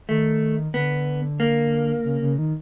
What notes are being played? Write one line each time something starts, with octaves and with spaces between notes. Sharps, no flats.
D#3 A3
D3 B3
A#3
C#3
C#3
D#3